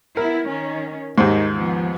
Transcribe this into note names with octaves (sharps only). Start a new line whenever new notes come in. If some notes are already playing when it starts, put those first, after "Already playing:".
B3 E4 A#4
D#3 C#4
D#2 G#2 D#3
F3 B3